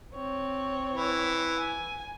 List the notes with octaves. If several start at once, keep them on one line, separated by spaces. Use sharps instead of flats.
C4 C#5
E3
G#5